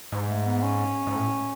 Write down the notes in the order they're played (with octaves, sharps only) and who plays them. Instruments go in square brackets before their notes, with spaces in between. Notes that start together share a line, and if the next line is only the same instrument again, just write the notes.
[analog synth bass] G#2
[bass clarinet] A3
B3
C#4
[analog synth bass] G#2
A2